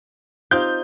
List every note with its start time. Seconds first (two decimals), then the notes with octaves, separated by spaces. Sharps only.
0.51 C4 D#4 F4 G4 F5 G6